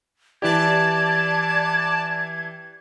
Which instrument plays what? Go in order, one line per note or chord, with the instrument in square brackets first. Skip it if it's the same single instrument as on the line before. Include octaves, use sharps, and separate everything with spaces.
[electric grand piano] E3 E4 G4 [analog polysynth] D5 A5 [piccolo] G#6